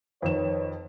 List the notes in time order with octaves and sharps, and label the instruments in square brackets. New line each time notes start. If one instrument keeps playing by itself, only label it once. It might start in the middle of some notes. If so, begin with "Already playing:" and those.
[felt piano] F2 D#3 E7 [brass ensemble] B4 C#5